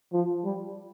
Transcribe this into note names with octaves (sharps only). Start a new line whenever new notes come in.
F3
G3